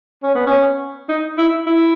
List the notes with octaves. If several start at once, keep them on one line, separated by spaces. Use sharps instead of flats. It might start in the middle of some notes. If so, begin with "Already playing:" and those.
C#4
B3
C#4
D#4
E4
E4